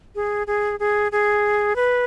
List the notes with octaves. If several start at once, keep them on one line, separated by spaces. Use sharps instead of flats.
G#4
G#4
G#4
G#4
B4